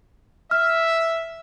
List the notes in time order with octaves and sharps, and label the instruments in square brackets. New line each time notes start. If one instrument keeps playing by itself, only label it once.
[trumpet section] E5 [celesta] F6